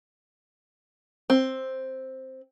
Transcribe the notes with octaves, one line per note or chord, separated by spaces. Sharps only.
C4